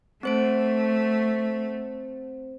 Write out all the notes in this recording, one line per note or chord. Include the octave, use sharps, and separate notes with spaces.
A3 C4 C5 D7